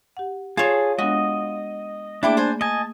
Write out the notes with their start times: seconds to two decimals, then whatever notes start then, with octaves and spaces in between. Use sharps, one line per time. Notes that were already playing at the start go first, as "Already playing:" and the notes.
0.17 G4 F#5
0.57 F4 G#4 C#5 A5
0.98 G#3 B3 D4 F#4 D#5
2.23 A3 A#3 D4 E4 G#4 G5 D6
2.37 C5 G#5
2.61 D#5 G#5 A5